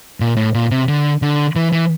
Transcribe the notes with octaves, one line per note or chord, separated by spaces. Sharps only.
A#2
A2
A#2
C3
D3
D3
E3
E3